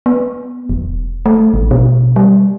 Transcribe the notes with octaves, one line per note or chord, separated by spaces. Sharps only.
B3
E1
A3
A1
B2
G3